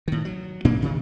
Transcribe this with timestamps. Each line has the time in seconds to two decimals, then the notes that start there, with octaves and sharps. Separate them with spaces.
0.08 A2 D#3
0.25 F#3
0.65 A1 A#2 A#3 D4
0.80 G2 C3 D#3